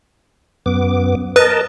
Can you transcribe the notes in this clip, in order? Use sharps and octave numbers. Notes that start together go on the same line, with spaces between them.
F#2 B3 D6
A#4 B4 D#5 A5